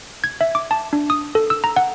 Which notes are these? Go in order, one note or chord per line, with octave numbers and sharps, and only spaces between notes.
G#6
E5
D6
A5
D4
D#6
A4
E6
A#5
F#5